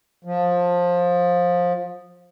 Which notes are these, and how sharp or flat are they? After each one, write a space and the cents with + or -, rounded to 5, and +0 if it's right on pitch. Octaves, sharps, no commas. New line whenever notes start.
F3 +20